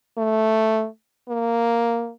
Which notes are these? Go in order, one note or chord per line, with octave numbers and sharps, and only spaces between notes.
A3
A#3